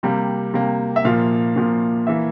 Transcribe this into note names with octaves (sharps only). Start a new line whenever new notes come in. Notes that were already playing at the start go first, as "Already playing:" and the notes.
C3 G3 A#3
C3 G3 A#3
E5
A#2 F3 A#3 F5
A#2 F3 A#3
E3 A#3 E5